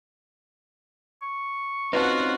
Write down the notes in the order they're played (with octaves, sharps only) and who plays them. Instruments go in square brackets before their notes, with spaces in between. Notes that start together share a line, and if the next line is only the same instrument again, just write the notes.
[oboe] C#6
[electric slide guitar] C4 C#4 D#4 [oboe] F4 [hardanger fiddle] F#4 F#5 [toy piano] B4 A5